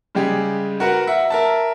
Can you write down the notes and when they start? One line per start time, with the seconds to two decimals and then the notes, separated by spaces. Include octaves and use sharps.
0.15 C#3 G3 G#3 G4 G#4
0.80 F#4 A#4 B4 F#5
1.07 E5 F#5
1.30 A#4 E5 A5